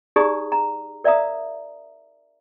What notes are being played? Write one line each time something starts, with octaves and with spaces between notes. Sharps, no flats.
D#4 G4 G#4 D5 A#5 D#6
A#5
A#4 D5 E5 F5 A#5 D#6